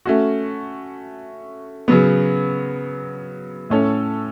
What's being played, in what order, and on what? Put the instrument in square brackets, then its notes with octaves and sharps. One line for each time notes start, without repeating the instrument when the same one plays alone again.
[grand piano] A3 C#4 F#4
C#3 F#3 B3
A2 A3 C#4 A4 C#5